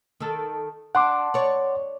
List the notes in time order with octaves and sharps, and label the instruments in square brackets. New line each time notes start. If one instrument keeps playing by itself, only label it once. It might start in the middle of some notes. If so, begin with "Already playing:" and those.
[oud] D#3 A4
[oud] D4 [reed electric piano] F#5 C6 D6
[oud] C#5 D5